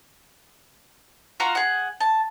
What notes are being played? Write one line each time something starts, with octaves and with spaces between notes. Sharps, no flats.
F4 F#4 F5 A#5
G#4 F#5
A5